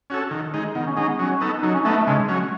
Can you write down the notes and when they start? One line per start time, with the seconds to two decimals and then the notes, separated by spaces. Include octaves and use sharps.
0.10 C#4 F#4 A4
0.31 D#3
0.54 G#3 D#4
0.75 D#3 B3
0.86 C#4
0.97 G#3 C#4 D#4
1.08 B3
1.19 F#3 C#4
1.41 B3 D#4 A4
1.62 F#3 D#4
1.74 C#4
1.84 A3 B3 D#4 A4
1.96 A3
2.06 C#3 G#3
2.28 F#3 C#4